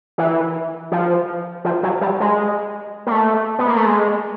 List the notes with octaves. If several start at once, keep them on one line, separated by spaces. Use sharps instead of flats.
E3
F3
F3
F#3
G3
G#3
A#3
A3
B3
A#3
A3
G#3